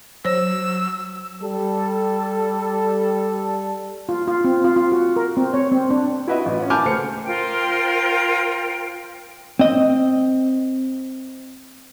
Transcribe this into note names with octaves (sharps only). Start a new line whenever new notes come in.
F#3 C5 C#5 E6
G3 A4
F4
F4
C4
F4
F4
F#4
A#4
C4
C#5
C4
D4
E4 F#4 B4 D#5 E5
A1 F4
C#4 F#5
G#5 A5 B5 D6 F6 G6
C#2 A3 C5 C#7
F4 A#4 C5 G5
C4 D#5